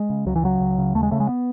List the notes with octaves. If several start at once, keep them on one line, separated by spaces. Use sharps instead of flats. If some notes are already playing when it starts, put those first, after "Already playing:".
Already playing: G#3
C#3
C#2 F#3
E3
C#3 F#3
C#2
C#3
D#2 A3
G#3
C#3 A3
G#3
B3